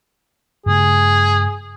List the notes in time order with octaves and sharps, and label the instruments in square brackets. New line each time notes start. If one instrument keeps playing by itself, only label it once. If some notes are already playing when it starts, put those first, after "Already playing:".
[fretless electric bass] G2 C#3 A3 [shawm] G#4